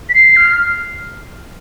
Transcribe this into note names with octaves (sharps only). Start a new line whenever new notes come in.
B6
C7
F6